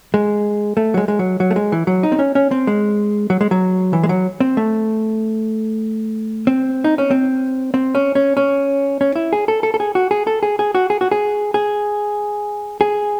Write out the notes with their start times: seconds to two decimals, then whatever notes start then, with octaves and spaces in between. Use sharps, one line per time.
0.14 G#3
0.77 A3
0.94 F#3
0.98 G#3
1.08 G#3
1.19 F#3
1.40 F#3
1.51 A3
1.56 G#3
1.72 E3
1.87 F#3
2.03 D#4
2.12 C4
2.19 C#4
2.35 C#4
2.51 C4
2.67 G#3
3.30 F#3
3.41 G#3
3.51 F#3
3.93 E3
4.03 G#3
4.09 F#3
4.40 C4
4.57 A3
6.47 C4
6.84 D#4
6.98 C#4
7.11 C4
7.74 C4
7.95 C#4
8.15 C#4
8.37 C#4
9.01 C#4
9.16 E4
9.33 G#4
9.48 A4
9.63 A4
9.74 A4
9.80 G#4
9.95 F#4
10.11 G#4
10.27 A4
10.43 G#4
10.59 G#4
10.75 F#4
10.90 G#4
11.01 F#4
11.12 G#4
11.54 G#4
12.81 G#4